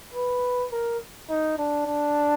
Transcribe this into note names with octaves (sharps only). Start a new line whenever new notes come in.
B4
A#4
D#4
D4
D4